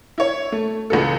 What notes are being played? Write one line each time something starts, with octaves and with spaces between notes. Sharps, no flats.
E4 C#5
A3
C#2 E3 A4